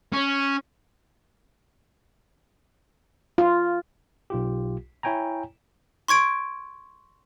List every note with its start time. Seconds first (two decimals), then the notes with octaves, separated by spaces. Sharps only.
0.13 C#4
3.38 F4
4.30 B1 F4 G4
5.03 E4 C#5 G5 G#5 A#5
6.08 C6 C#6 G#6 D7